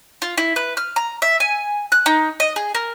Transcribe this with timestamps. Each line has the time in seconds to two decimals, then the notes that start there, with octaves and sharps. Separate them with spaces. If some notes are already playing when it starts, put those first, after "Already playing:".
0.22 F4
0.37 E4
0.56 B4
0.77 F6
0.96 A#5
1.22 E5
1.40 G#5
1.92 F#6
2.06 D#4
2.40 D#5
2.56 G#4
2.75 A#4